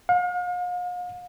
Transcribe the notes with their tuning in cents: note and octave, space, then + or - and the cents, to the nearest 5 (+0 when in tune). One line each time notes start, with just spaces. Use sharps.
F5 +40